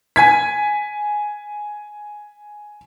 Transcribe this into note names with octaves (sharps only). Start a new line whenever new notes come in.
G#5 G#6 B6